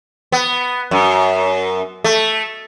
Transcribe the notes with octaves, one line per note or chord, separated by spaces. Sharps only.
B3
F#2
A3